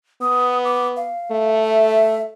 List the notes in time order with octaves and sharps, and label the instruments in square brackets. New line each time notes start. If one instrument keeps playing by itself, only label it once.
[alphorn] B3 [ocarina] D#6
[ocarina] D6
F5
[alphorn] A3
[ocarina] E5